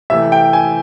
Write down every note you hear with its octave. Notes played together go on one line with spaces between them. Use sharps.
C3 E3 A3 E5
G5
G#5